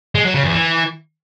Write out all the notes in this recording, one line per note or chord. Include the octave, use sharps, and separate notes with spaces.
G#3
F#3
C#3
E2
E3